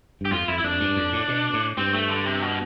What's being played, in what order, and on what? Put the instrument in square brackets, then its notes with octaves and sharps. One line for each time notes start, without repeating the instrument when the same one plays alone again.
[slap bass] G2 [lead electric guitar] G4
[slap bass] F2 [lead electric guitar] F4
[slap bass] F2 [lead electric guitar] E4
[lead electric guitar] E4
[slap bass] F2 [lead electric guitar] D4
[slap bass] G2
F2
A2
B2
A2
[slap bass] G2 [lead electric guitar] C4
[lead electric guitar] A3
D3
C3
B2